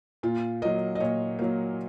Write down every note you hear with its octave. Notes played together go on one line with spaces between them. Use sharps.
A#2 F4
F#3 A#3 D#5
D#5
A#2 C#5
F#3 A#3